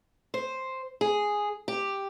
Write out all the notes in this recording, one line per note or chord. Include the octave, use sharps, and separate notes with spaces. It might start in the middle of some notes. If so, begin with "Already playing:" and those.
C5
G#4
G4